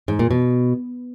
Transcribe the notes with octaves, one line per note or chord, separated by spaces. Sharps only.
G#2
A#2
B2